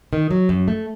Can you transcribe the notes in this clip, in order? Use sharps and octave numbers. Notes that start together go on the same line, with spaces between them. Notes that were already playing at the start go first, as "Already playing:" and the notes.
D#3
F#3
F#2
A3